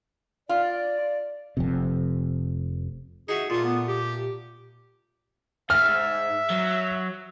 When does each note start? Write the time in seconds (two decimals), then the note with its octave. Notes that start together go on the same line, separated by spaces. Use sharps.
0.49 F4 D5
1.57 F1 F2 C3
3.29 D#4 F#4 G#4 E5
3.50 A#2 A3 F4
3.64 B3
3.88 G4
5.70 G#2 E5 F6
6.50 F#3